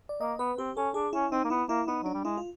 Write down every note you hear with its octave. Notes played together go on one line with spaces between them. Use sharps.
D5
A#3 D#5
B3 B4
C4 G4
C#4 A4
D4 G#4
C#4 E4
C4 D#4
A#3
B3 E4
A#3 E4
B3 D#4
F#3 D4
G3
G#3 E4
F4